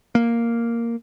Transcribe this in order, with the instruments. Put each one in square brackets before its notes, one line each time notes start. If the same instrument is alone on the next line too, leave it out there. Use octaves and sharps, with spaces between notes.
[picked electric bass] A#3